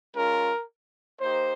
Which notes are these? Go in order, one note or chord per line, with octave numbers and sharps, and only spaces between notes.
G#3 C#4 F4 A#4
A#3 D#4 G4 C5